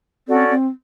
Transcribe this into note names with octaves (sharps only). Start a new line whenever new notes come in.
C4 C#4 F#4 A4 D5
C4